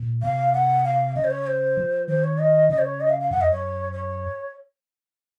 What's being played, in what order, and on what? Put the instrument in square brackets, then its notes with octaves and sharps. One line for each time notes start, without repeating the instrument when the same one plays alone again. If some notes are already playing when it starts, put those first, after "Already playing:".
Already playing: [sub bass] A#2
[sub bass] C3 [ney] F5
[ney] F#5
F5
[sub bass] C#3 [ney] D#5
[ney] C5
C#5
C5
[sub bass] F3
[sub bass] D#3 [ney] C5
[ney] C#5
D#5
[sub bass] C#3 [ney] D#5
[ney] C5
C#5
D#5
F5
F5
[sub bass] F#2 [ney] F#5
[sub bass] F2 [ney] D#5
[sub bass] F#2 [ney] C#5
[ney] C#5